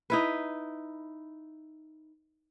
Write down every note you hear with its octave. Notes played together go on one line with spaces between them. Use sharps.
D#4 E4 B4